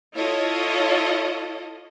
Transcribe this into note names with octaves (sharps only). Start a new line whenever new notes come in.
E4 F4 A4 C#5 D#5